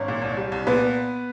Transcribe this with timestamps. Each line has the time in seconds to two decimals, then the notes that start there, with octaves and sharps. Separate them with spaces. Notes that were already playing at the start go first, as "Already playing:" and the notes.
Already playing: G#1 C#4 C#5
0.08 A#2
0.22 C2
0.37 G3
0.52 C2
0.67 A#2 B3 B4